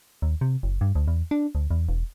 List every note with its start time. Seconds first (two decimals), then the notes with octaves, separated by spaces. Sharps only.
0.22 D#2
0.41 C3
0.63 F#1
0.81 G2
0.95 D2
1.08 E2
1.31 D4
1.55 D2
1.71 E2
1.89 E1